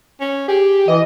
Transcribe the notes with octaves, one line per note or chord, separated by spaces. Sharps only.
C#4
G4 G#4
E3 D#5